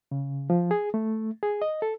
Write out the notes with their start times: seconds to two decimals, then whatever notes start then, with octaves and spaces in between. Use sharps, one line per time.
0.11 C#3
0.50 F3
0.71 G#4
0.94 A3
1.43 G#4
1.62 D#5
1.82 A4